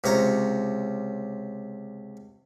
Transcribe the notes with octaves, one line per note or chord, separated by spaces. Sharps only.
C#2 C3 C#5 A#5